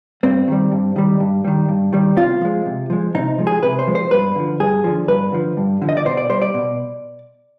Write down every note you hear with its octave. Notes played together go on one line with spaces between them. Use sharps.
G2 C4
D#3 G3
G2
D#3 G3
G2
D#3 G3
G2
D#3 G3
C3 F4
F3 G#3
C3
F3 G#3
C3 D#4
F3 G#3
G#4
C3 B4
C5
F3 G#3
C5
G2 B4
D3 F3
G2 G#4
D3 F3
G2 B4
D3 F3
G2
D3 F3
D#5
D5
B2 C5
D5
G3 C5
D5
B2